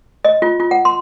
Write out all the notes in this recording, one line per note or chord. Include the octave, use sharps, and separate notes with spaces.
D#5
F4
F4
F#5
C6